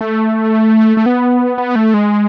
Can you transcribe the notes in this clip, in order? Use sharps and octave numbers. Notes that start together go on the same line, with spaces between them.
A3
A3
B3
B3
A3
G#3